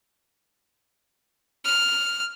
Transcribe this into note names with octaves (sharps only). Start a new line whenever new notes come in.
F6